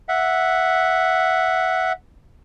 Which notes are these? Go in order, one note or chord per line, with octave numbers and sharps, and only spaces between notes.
E5 F#5